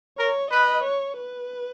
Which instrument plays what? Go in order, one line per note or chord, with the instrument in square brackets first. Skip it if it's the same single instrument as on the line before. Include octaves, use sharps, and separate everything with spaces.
[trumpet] A#4 [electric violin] C#5
[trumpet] B4 [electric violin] D#5
[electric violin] C#5
B4